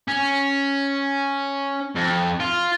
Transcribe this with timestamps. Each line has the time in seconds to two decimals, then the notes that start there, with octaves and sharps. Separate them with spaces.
0.08 C#4
1.95 F2
2.40 F4